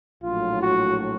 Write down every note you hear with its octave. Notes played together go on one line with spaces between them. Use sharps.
A#1 A2 F#3 F4
F#4